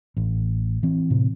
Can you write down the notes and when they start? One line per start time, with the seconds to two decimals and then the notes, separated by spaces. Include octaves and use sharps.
0.17 A1
0.83 E3 C4
1.10 A2 C3